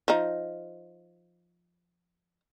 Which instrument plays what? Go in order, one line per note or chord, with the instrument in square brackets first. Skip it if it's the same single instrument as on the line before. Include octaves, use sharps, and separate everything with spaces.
[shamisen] F3 D#4